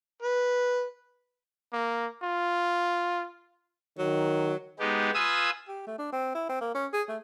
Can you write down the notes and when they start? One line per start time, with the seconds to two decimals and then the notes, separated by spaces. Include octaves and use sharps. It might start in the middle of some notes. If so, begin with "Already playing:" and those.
0.22 B4
1.73 A#3
2.23 F4
3.99 D#3 F#3
4.79 G#3 B3 D#4 G4
5.14 F4 B4 G#5 D#6 E6
5.68 G4
5.87 A3
5.99 D4
6.13 C4
6.35 E4
6.50 C4
6.61 A#3
6.75 C#4
6.93 G#4
7.09 A3